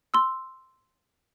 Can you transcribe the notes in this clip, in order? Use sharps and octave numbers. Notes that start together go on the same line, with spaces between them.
C6 E6